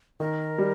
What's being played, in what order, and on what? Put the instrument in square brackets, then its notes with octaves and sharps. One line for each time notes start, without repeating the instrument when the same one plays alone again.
[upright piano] D#3 [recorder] A#4
[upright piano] G3